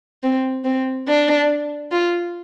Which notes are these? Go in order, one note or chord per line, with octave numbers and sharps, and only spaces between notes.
C4
C4
D4
F4